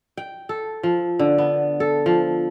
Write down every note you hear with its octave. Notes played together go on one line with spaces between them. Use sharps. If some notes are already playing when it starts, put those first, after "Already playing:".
G5
A4
F3
D3
B3
A4
F3